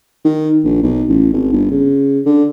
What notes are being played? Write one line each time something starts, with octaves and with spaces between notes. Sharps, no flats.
D#3
A#1
B1
A1
G#1
G1
C#3
D3